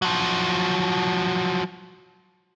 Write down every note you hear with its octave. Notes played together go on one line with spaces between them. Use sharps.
F3 F#3